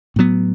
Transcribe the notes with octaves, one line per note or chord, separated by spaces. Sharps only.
A2 F#3 B3